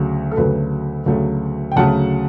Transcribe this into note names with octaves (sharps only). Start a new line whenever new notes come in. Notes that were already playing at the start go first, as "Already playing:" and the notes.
Already playing: D2 C#3 F#3 A3
A4
D2 C#3 F#3 A3 B4
D2 C#3 F#3 A3
G5
D2 C#3 F#3 A3 F#5 A5